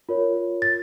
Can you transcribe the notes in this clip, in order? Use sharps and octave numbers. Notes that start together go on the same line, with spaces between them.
F4 A#4 C#5
A6